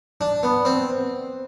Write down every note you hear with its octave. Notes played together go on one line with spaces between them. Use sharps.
D4
B3
C4